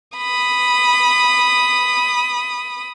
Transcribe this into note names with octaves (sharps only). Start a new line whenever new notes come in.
B5 D#6